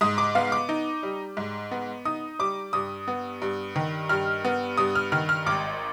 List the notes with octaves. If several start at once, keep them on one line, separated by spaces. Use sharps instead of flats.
G#2 D#6
D6
B3 F5
D6
D#4
G3
G#2
B3
D#4 D#6
G3 D6
G2 D#6
B3
G2
D#3
G2 F6
B3
G2 D#6
F6
D#3 F6
F6
G#1 D6